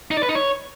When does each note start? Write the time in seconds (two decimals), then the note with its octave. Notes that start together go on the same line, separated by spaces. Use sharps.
0.11 D#4
0.17 D5
0.23 B4
0.29 D#4
0.35 C#5